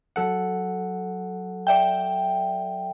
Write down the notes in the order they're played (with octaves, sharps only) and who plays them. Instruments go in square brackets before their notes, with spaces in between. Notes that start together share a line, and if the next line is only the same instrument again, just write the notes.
[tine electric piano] F#3 A4 F#5
[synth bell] D5 E5 G5